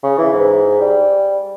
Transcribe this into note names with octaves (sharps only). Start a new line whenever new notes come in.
C#3
E3
G#2
G3